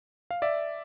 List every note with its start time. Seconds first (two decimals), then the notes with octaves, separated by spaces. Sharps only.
0.31 F5
0.42 D5 E5